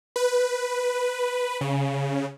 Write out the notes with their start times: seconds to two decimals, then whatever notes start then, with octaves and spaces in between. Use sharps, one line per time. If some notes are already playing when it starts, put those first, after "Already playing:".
0.16 B4
1.61 C#3